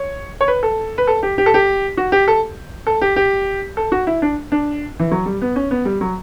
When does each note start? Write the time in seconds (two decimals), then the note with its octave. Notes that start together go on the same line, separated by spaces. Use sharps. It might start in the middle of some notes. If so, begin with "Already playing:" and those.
Already playing: C#5
0.41 C#5
0.48 B4
0.63 A4
0.98 B4
1.07 A4
1.23 G4
1.38 G4
1.46 A4
1.54 G4
1.97 F#4
2.12 G4
2.28 A4
2.87 A4
3.01 G4
3.16 G4
3.77 A4
3.92 F#4
4.07 E4
4.22 D4
4.52 D4
4.99 E3
5.11 F#3
5.26 G3
5.42 B3
5.56 C#4
5.71 B3
5.85 G3
6.01 F#3